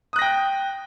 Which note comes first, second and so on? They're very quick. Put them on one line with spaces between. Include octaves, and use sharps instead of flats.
D#6 F#6 A#6 G5